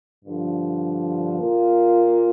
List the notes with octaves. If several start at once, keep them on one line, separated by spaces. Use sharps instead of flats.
G2 D3 F3
A#2 A#3 F4